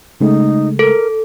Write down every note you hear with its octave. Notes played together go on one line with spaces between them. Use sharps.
C#3 G#3 A3 D#4
A4 A#4